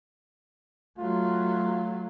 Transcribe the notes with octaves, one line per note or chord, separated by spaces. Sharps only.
F#3 A3 F4